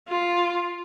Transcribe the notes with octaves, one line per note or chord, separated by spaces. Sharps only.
F4